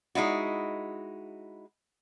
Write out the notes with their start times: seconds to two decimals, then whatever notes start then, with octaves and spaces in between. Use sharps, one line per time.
0.15 G#3 D#4 E4 F#4